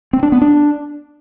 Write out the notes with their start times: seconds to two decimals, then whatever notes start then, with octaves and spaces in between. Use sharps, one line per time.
0.13 C4
0.23 D4
0.32 B3
0.42 D4